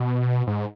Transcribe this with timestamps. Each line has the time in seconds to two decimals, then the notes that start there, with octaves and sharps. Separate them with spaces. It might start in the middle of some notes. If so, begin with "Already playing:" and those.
Already playing: B2
0.47 G#2